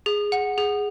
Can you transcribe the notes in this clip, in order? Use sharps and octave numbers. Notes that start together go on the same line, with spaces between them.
G#4
F#5
G#4